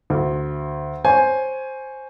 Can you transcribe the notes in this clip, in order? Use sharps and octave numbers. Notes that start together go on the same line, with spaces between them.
D2
C5 C#5 G#5